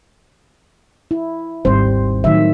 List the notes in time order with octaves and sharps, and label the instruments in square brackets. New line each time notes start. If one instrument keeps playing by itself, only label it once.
[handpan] E4
[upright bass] G#1 D#2 [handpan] G3 C4 C5
[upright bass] A2 [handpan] D#3 F#3 E5